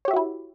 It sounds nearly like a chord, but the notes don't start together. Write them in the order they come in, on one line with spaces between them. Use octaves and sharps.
C#5 G4 E5 F#4 E4